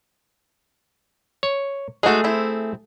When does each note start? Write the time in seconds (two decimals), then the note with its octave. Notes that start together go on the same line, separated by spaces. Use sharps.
1.43 C#5
2.03 G#3 A3 D#4 F#4 G#4
2.24 C4 E4